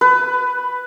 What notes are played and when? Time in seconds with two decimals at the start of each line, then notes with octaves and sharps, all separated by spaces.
0.01 B4